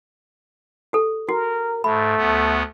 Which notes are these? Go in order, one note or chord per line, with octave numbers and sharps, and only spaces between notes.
G4 A4
F#4 A#4
G#2 A3 B5
D2 B3